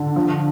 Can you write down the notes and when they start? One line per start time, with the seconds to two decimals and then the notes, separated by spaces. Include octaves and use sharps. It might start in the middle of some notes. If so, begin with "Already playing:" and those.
Already playing: D3
0.16 F3